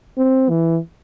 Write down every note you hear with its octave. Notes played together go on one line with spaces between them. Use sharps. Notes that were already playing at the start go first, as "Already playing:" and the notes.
C4
E3